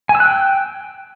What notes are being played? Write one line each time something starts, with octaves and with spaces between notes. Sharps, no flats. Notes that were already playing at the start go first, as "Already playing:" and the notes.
G#5
E6
F#6
G5